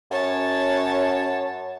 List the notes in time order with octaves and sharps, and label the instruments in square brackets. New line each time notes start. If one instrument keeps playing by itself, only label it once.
[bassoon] F#2 [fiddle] C#5 A5